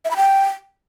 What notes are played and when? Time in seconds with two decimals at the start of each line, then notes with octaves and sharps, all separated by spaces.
0.05 E5
0.11 B5
0.17 G5